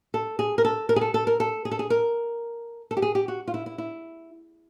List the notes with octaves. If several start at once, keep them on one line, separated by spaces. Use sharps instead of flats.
A4
G#4
A#4
A4
A#4
G#4
A4
A4
A#4
A4
G#4
A4
G#4
A#4
A4
G4
G#4
G4
F#4
F4
E4
E4
E4